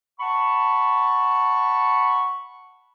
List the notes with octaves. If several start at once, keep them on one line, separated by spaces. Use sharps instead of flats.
F#5 A5 B5 C#6